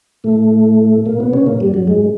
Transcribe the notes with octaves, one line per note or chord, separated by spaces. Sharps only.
A2 A3
A#2 A#3
B2 B3
C#3 C#4
A#2 A#3
G2 G3
F#2 F#3
G#2 G#3